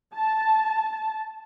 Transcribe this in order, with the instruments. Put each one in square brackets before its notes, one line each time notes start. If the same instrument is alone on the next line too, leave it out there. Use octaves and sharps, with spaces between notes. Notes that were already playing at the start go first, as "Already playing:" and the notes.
[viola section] A5